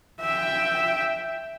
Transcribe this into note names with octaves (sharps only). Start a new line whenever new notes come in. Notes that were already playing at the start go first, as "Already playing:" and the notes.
E5 G5